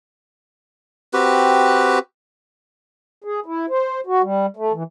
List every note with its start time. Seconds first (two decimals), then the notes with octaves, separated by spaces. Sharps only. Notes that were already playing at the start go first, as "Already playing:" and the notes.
1.13 C4 F#4 G4 B4
3.24 G#4
3.46 E4
3.69 C5
4.07 F#4
4.22 G3
4.57 A3
4.73 E3